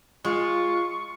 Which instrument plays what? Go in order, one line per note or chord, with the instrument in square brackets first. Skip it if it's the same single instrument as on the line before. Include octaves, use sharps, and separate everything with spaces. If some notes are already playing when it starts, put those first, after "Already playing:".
[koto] G#3 [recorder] F4 [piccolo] C#6